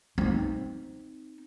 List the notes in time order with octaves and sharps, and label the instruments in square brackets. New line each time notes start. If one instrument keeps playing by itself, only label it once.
[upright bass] C4 D#4